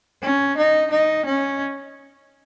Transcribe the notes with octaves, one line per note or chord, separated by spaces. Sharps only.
C#4
D#4
D#4
C#4